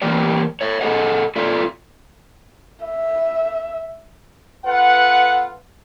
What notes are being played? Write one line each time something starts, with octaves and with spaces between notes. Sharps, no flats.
E3 G3 A#3 G4 D5
C#5 E5
G#4 A4 D#5 F#5
F4 A4 D5 E5 F5
E5
B3 F4 A4 B4 F#5